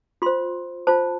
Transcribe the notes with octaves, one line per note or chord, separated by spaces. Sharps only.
F4 C5 C6
F4 C5 A5